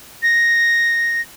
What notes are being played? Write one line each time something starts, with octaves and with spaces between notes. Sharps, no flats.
A#6